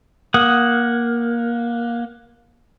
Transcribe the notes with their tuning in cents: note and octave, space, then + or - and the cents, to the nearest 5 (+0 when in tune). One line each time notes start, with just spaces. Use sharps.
A#3 +15 F#5 +0 D#6 +0